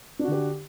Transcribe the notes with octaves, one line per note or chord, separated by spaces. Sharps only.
D3 D4 F#4 G4